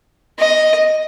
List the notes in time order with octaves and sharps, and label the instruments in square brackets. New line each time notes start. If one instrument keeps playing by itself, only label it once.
[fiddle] D#5